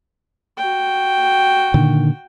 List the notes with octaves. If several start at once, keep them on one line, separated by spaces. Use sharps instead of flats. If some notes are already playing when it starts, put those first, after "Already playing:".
F#4 G5
A#2 D3 D#3